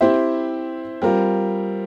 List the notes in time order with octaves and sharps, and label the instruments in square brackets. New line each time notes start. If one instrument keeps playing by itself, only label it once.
[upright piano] C4 E4 G4 C5 E5
G3 C4 F4 A#4